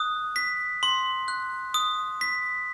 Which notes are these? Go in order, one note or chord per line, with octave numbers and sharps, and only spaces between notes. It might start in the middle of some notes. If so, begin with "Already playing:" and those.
Already playing: D#6 F#6
B6
C6
F#6
D#6
B6